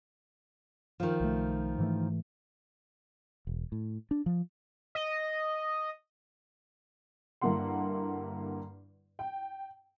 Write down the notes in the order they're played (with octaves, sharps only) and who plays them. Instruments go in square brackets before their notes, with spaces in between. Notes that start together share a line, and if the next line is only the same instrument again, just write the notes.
[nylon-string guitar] D#3 F3
[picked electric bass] B1 A3
G#2 E3 A3
[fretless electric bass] E1
A2
D4
F3
[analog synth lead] D#5
[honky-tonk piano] G2 D3 A#3 E4 F#5 C6
G5